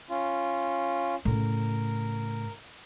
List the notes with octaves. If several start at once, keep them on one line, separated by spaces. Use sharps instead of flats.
C#4 F4
A2 C#3 A#4